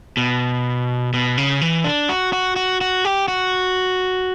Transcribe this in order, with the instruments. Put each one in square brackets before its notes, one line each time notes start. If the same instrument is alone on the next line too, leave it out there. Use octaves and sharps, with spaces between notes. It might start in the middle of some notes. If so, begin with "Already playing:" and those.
[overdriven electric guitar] B2
B2
C#3
E3
D4
F#4
F#4
F#4
F#4
G4
F#4